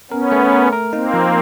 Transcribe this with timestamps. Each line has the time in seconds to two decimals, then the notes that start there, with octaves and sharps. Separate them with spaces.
0.11 B3 C#4 A#4
0.32 A3
0.52 A#4
0.72 A#4
0.93 A#3 C4 D#4
1.14 F3